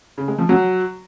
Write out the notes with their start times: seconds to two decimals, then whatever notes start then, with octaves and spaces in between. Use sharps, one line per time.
0.18 C#3
0.28 G#3
0.39 F3
0.49 F#3